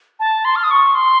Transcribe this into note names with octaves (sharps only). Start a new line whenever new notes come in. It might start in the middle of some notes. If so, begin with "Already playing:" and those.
A5
C6
F6
D#6
C#6
C6